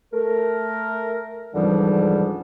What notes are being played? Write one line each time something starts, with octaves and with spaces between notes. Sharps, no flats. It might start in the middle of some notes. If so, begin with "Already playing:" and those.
A3 A#4
C#2 G#2 D3 E3 F3 G3